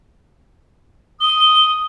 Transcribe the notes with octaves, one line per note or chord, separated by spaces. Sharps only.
D#6 G7